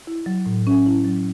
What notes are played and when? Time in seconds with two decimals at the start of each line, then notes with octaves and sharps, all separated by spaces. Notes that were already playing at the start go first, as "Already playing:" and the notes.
0.07 E4
0.26 F#3
0.46 A2
0.67 C#4
0.86 E4
1.05 F#3